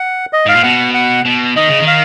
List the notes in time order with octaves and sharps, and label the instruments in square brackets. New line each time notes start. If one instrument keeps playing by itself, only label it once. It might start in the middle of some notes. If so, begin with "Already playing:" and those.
Already playing: [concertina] F#5
D#5
[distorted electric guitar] G#2 [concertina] F5
[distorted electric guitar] A#2
[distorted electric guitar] B2 [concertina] F#5
[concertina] F#5
[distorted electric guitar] B2
[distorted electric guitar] D#3 [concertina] D#5
[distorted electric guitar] C#3
D#3
[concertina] F5